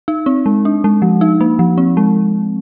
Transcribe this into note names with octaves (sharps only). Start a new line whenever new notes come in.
D#4
C4
G#3
D4
G#3
F3
D#4
A#3
F3
C4
G#3